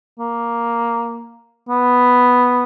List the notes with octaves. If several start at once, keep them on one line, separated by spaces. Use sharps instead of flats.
A#3
B3